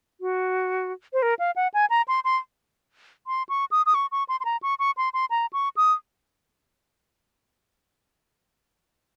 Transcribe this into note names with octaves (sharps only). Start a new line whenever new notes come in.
F#4
C5
A#4
F5
F#5
G#5
A#5
C6
C6
C6
C#6
D#6
D#6
C#6
C#6
C6
C6
A#5
C#6
C#6
C6
C6
A#5
C#6
D#6